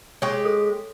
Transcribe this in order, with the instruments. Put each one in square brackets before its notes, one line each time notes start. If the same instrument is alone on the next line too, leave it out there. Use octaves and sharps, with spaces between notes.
[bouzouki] G#3 G4 [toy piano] C#5 C#6
[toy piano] A4